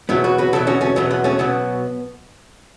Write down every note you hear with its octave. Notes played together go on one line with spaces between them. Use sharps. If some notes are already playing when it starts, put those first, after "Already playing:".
E2 B2 F#3 B3 E4
F#4 B4
F#4 B4
E2 B2 F#3 E4 A4
C#4 F#4
A3 C#4
E2 B2 F#3 B3
B3
A3 C#4
B2 F#3 B3